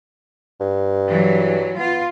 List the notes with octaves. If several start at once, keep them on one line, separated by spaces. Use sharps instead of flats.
G2
E3 F#3
B3 F4